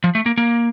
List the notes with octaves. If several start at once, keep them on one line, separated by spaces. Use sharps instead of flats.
F3
A3
A#3
A#3